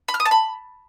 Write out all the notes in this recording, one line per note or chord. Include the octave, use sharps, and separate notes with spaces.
B5
F6
D#6
A5
B5